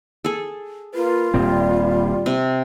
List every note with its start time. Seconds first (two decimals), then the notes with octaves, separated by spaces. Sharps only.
0.24 G#4 A4
0.95 A#3 F4 A#4 B4
1.34 D#1 A#2 G3 C4
2.26 C3